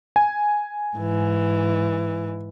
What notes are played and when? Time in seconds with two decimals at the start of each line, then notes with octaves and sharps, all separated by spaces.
0.16 G#5
0.96 G#2 E3